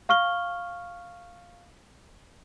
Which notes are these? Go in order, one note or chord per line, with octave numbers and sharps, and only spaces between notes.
F5 C#6 F6 G7